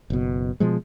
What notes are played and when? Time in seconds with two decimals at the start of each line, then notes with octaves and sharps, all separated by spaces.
0.10 F#1 B2
0.60 B2 F3 G#3